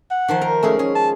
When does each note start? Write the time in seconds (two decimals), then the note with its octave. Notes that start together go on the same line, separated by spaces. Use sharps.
0.11 F#5
0.28 D#3 F3 C5
0.41 A#4
0.63 G#3 A3 C#4 G#4
0.79 C#4 G#4
0.95 A5